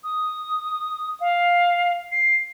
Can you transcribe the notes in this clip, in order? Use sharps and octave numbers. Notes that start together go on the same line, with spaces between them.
D#6
F5
C7